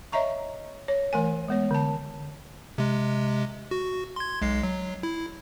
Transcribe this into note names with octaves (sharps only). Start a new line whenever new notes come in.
C#5 D#5 E5 A#5 C#6
C#5
E3 A3 A#4 G#5
G#3 B3 C#5
D3 A5
C3 G#3
F#4
C6 G#6
B1 G#3 C7
F#3
E4